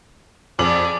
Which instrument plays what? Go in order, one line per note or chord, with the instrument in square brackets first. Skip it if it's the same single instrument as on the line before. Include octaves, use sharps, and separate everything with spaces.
[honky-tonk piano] F2 F#7 [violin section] G#4 D5 [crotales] D6